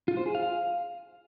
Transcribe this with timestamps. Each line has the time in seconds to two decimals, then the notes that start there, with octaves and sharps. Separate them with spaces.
0.08 F4
0.17 C5
0.26 G#4
0.35 F5